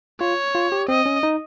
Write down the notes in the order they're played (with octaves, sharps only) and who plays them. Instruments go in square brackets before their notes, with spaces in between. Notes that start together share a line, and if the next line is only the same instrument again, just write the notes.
[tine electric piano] F4 [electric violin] C#5
[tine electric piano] F4
G4
[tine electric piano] C4 [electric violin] D#5
[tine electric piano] C#4
D#4